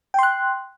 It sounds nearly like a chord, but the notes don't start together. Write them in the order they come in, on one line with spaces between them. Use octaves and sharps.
G5 C6 F#6